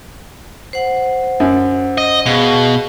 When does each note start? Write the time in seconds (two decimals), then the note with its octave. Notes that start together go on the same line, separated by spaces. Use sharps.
0.73 C5 F#5
1.40 F#2
1.98 D#5
2.26 B2 G#4 F5